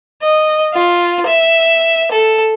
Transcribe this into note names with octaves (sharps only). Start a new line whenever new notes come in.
D#5
F4
E5
A4